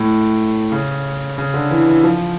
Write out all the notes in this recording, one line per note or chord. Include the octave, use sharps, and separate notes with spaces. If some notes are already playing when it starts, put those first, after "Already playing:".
Already playing: A2
C#3
C#3
D3
E3
E3
F3